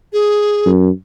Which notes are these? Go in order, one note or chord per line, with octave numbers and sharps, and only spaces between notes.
G#4
F#2